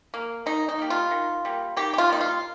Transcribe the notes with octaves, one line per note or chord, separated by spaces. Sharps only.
A#3
D#3 D#4
D#4
G3 A#3
F4
D#3
G3 A#3
D#3 G4
G4
F4
G3 A#3 D#4
F4